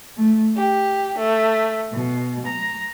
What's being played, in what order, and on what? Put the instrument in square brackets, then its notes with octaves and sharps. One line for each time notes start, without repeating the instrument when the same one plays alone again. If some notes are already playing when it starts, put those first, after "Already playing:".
[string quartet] A3
G4
A3
B2
A#5